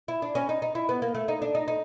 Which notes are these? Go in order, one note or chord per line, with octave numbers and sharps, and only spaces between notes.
E4
D4
C#4
D#4
D#4
E4
B3
A#3
A3
D#4
D4
D#4
D#4